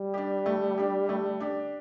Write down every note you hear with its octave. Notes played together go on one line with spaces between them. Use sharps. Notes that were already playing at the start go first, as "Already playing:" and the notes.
Already playing: G3
D4 G4
A3
D4 G4
A3
D4 G4